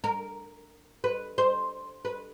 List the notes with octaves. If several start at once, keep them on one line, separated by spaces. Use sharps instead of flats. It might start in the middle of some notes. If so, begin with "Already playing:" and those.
A#4
B4
C5
B4